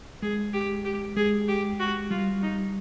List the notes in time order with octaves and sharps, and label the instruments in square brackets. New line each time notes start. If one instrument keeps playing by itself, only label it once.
[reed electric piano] G#3 [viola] G#4
[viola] G4
G4
[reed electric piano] G#3 [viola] G#4
[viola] G4
F#4
[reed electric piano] G3 [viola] F4
[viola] D#4